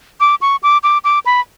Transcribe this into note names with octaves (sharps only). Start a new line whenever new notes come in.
D6
C#6
D6
D6
D6
B5